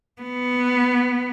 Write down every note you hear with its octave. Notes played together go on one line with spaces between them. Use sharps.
B3